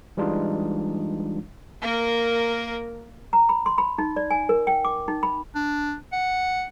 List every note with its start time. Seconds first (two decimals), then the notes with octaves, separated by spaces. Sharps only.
0.17 E3 G3 G#3 D4 D#4 F4
1.82 A#3 A#4
3.33 A#5
3.49 B5
3.66 C6
3.78 B5
3.98 D#4
4.16 D5
4.31 G#5
4.49 A#4
4.67 G5
4.85 D6
5.08 D#4
5.23 B5
5.55 D4
6.12 F#5